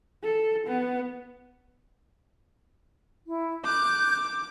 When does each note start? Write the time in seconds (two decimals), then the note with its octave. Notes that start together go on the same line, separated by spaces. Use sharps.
0.24 A4
0.67 B3
3.26 E4
3.64 D6 F#6 G6